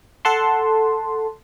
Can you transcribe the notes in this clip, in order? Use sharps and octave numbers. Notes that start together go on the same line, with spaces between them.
A4 F#5 A5 C6